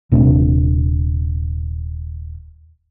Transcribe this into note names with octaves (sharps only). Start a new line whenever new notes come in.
D#1 C3 A3 D4